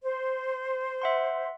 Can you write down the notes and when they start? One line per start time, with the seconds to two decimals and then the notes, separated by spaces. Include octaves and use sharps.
0.03 C5
1.02 E5 F#5 C6